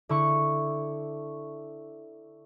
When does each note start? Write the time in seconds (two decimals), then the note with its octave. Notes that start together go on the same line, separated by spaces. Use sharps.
0.09 D3 E4 C#6